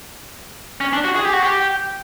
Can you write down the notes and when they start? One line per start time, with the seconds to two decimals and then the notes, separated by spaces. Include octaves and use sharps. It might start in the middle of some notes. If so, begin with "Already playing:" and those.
0.81 C#4
0.93 D4
1.04 F#4
1.16 G#4
1.25 G4
1.33 F#4
1.42 G4